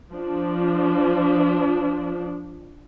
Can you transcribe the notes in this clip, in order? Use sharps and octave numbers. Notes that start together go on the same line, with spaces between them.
F3 D4